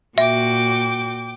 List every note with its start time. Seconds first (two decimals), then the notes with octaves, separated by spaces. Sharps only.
0.18 A#2 F#4 E5 G5 D6